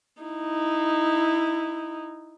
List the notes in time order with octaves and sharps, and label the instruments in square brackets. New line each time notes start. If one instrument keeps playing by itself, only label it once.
[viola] D#4 E4